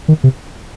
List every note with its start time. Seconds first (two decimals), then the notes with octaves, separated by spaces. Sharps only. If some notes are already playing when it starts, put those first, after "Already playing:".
0.08 D#3
0.24 C3